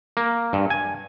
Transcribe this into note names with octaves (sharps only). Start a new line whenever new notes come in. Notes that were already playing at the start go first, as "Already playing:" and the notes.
A#3
G2
G#5